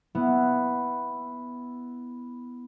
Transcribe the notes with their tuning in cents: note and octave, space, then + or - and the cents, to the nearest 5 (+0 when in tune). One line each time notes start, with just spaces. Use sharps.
B3 +0 E4 +0